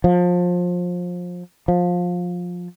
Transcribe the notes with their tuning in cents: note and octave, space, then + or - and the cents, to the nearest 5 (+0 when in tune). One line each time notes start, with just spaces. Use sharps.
F3 +25
F3 +20